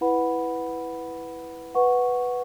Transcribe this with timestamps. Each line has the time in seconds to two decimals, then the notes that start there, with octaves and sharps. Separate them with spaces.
0.01 E4 B4 F#5 B5
1.75 B4 F#5 C#6